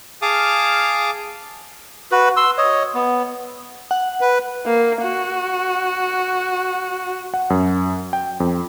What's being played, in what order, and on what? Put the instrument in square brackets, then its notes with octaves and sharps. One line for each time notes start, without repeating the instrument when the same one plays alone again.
[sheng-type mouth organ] G#4 F5 A5 D6 D#6 F6
[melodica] F#4 B4
C6 E6
C#5 D#5
B3
[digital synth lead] F#5
[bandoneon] B4
[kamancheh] A#3
F#4
[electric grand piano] F#5
F#2
G5
F2